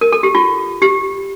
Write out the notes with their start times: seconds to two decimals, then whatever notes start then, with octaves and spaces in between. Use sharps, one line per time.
0.01 A#4
0.12 A4
0.23 G4
0.35 F4
0.82 G4